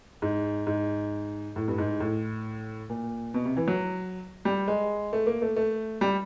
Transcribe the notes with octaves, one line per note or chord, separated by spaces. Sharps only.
G#2
G#2
A2
G2
G#2
A2
A#2
B2
C3
E3
F#3
G3
G#3
A3
A#3
A3
A3
G3